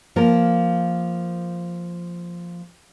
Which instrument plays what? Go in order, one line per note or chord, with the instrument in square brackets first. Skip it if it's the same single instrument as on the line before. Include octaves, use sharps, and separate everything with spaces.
[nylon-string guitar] F3 A#3 A#4